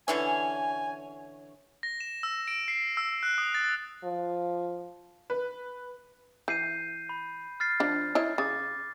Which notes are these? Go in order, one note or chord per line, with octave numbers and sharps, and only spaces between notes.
D3 E3 C#4 G#5
A#6
E7
E6
D7
C7
E6
F#6
D#6
A6
F3
B4
E3 G6 C7 D#7
B5
F6 A6 C7
F3 D4
E4 C#5 D#5
C#3 D6 A6